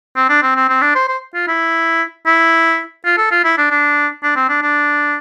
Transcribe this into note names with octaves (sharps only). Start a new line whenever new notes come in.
C4
D4
C4
C4
C4
D4
C5
C5
F4
E4
E4
F4
A4
F4
E4
D4
D4
D4
C4
D4
D4